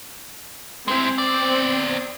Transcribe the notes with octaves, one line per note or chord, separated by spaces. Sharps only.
G#3 C4 E4
B3 D5